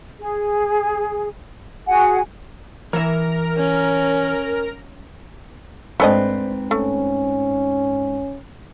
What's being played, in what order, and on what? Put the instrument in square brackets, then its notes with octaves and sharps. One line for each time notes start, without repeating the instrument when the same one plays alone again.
[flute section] G#4
F#4 G#4 F#5 G#5
[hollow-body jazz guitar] E3 E5 [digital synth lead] A#4
[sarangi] C#4
[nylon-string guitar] G#2 C4 B4 [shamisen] A3 D4 D#5
[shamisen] A3 [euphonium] C#4